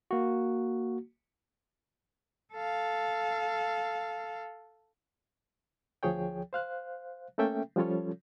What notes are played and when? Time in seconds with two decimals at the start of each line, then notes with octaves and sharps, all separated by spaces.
0.11 A#3 F#4
2.54 A4 F5
6.03 D2 F3 G#4 C#5 G5
6.53 C5 F5 F#6
7.38 A3 A#3 C#4 A4 E5 G5
7.76 F3 G3 C#4 F4 A4 C#5